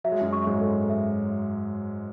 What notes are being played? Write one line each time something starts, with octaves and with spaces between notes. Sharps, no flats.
F#3 E5
G#3
F#2 F#3
C#6
G#2 G#3
A4
E5